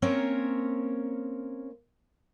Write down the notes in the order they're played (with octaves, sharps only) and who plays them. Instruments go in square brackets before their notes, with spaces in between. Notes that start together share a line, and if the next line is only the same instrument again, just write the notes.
[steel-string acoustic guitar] A#3 C4 C#4 A#4 C#5